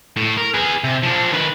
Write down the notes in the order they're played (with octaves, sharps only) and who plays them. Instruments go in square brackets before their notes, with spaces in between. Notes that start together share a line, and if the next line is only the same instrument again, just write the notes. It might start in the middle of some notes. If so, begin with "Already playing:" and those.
[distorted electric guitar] A2
A#4
G#4 B4
C3
F3 D4
D#3 B4